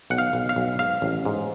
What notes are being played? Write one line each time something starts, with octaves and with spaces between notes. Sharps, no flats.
B1 F#5
F5
B1
F5
B1
G#2 F5
A1
G#2